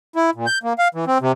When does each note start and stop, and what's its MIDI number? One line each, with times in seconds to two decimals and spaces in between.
0.16 0.30 64
0.35 0.46 46
0.46 0.58 91
0.63 0.73 58
0.78 0.88 77
0.94 1.05 52
1.07 1.18 60
1.21 1.32 48